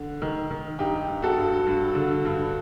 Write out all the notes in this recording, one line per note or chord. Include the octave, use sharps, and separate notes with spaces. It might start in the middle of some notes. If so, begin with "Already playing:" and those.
Already playing: D3
D#3
D#3
G2 D#4 G4
G2
F#4 A4
G2
G2
D3
G2